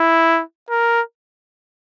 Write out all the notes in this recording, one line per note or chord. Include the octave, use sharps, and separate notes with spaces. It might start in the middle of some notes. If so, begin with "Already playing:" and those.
Already playing: E4
A#4